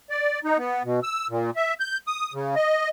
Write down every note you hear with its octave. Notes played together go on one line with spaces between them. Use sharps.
D5
D#4
B3
B2
E6
A#2
E5
G6
D#6
C#3
D#5